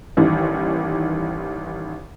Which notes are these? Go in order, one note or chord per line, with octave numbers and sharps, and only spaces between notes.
A1 D#2 D#3 E3 G3